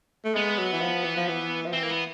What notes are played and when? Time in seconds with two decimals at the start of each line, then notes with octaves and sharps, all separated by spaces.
0.24 A3
0.35 G#3 B3
0.59 F#3
0.73 E3
0.81 F3
1.04 E3
1.17 F3
1.28 E3
1.66 F3
1.73 E3 C4
1.83 A#3
1.90 B3